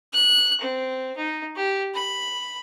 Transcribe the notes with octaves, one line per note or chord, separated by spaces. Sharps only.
F#6
C4
D#4
G4
B5